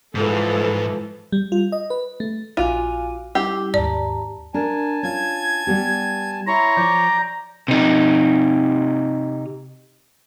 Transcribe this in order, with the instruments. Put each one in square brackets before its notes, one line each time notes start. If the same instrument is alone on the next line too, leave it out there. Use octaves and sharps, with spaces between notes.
[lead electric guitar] G#2 [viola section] E3 F3 A4
[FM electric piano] G3
F4
D#5
B4
A3
[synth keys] A#1 D6 D#7 [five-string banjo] F4 [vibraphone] F#4 F5 G#5
[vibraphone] G3 E4 D6 [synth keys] C#4 E6 [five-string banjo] G4
[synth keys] D#2 G#2 [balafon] D5 [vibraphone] A5 A#5
[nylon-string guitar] D4 A#4 [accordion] G#5 A5
[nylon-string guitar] C#4 F4 [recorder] G#6
[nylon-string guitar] G3 B3 G4
[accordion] E4 C6 [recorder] C#5 [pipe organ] A#5
[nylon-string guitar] F3 [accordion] D5 D6 G6
[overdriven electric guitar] C3 D#4